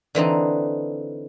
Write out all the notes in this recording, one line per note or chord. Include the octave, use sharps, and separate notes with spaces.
D3 E3 C4 D#4